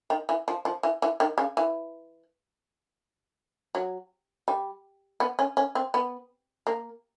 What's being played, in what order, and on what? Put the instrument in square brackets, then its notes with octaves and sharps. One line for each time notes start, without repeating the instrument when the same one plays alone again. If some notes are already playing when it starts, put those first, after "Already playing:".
[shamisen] D#3
E3
F3
F3
E3
E3
D#3
C#3
E3
F#3
G3
B3
C#4
C#4
C4
B3
A#3